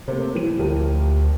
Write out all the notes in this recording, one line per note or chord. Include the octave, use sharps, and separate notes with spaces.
C3 A3 A#3 C5
G2 E3 D#7
D2 F3 G4 A#4